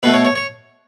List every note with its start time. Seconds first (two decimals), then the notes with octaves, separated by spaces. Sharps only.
0.03 B2 A3 B4
0.14 C#5
0.25 C#5
0.35 C#5